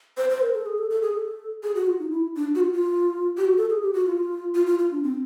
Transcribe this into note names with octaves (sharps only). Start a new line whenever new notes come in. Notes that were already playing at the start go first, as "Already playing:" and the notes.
C5
C5
A#4
A4
G#4
A4
A4
G#4
A4
G#4
F#4
F4
D#4
E4
D4
F#4
F4
F4
G4
F#4
A4
G#4
G4
F#4
F4
F4
F4
F4
D4
C4